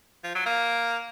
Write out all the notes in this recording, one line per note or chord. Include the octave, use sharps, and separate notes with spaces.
F3
F#3
A#3